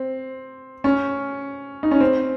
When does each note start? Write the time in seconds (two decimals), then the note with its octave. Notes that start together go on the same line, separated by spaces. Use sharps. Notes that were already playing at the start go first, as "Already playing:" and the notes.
Already playing: C4
0.84 C#4
1.83 D#4
1.91 C#4
2.00 C4